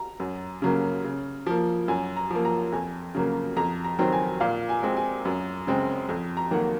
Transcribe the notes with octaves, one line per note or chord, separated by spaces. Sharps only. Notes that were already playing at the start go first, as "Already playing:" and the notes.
Already playing: A#5
F#2
C#3 F#3 A#3
C#3
F3 A#3
F#2 G#5
A#5
F3 A#3
A#5
F2 G#5
C#3 F#3 A#3
F2 A#5
A#5
D#3 F#3 C4
G#5
A#2 F5
G#5
G#3 C4
G#5
F#2
C#3 G#3 C4
F2
A#5
D#3 F#3 A#3 F#5